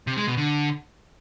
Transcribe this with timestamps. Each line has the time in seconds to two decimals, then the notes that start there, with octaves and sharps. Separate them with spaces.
0.07 C3
0.17 G#3
0.27 B2
0.37 D3